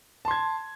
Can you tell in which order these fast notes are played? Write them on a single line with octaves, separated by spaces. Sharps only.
A5 C6 G#6